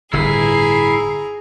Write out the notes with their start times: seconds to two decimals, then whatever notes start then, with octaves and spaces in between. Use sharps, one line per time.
0.13 G1 A2 D3 E4 G#4 A#5 C7